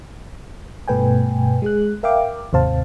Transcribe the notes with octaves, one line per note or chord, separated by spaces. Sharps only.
G2 B2 A3 B4 G5 G#5
G#3 G#4 F#6
A#4 E5 F5 G5 D6
D#2 G#2 C3 C5 F5 A5